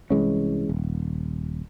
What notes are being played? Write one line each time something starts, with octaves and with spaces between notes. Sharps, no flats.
C2 E3 G#3 C#4
D#1